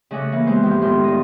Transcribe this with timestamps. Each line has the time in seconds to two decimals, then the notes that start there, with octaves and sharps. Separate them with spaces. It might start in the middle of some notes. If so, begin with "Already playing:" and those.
0.11 C#3 A3 D#5 F#5 D6
0.32 E3 A#3
0.47 G#3 B3 G4 C5
0.62 F2 A2 F3 G5 G6
0.82 A2 D#3 G#3 B3 C5 C6
1.04 G2 D#5